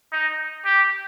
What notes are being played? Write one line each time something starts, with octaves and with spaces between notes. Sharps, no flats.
D#4
G4